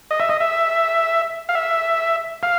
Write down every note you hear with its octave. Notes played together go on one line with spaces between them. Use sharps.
D#5
E5
D#5
E5
F5
E5
F5